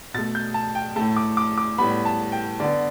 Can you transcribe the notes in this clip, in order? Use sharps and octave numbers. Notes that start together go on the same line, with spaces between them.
B2 A3 A6
G6
A5
G5
A2 A3 A5
D6
D6
D6
A2 G3 B3 B5
A5
G5
D3 B3 D5